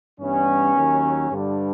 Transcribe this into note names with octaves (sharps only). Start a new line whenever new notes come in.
G2 E3 G3 B3 C#4
D#2 D#3 F#3
G2 D3 G3